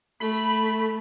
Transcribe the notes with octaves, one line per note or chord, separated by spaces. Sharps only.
A3 B5